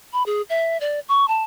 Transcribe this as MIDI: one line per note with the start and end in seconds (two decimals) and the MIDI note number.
0.13 0.25 83
0.26 0.42 68
0.50 0.80 76
0.81 1.00 74
1.09 1.26 85
1.28 1.44 81